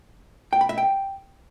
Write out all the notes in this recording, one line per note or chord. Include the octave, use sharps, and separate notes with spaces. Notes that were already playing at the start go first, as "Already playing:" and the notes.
G5
B5
E5
G5